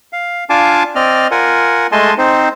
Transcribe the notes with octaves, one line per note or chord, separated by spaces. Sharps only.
F5
D4 F4 F5 G#5 A5 D6
C4 D5 D#5 F6
F4 A#4 F#5 G#5
G#3 A3 D#5 G#5 A5 C6
C4 D#4 C5